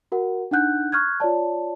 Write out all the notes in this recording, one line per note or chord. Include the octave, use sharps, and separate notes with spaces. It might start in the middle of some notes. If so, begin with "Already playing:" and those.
F#4 A#4 F#5
D4 D#4 F#5 F#6 G6
C#6 F6 F#6 G#6
F4 C#5 D5 A5